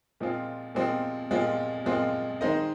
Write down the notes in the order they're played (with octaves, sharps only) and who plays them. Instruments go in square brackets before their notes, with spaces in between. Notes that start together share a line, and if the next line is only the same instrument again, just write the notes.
[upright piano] A#2 F3 G#3 C4 F4
A#2 F3 G#3 C4 F4
A#2 F3 G#3 C4 F4
A#2 F3 G#3 C4 F4
D#3 G#3 D#4 C5 D#5